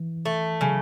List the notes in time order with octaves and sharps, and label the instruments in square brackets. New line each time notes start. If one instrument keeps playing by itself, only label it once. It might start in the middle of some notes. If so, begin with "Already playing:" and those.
Already playing: [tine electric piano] E3
[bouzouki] A3
[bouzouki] C#3 [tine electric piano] F#3